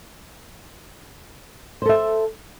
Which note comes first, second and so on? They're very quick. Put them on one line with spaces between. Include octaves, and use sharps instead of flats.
C5 A4 E5